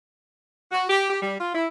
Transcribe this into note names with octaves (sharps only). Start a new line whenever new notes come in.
F#4
G4
G4
G3
F4
E4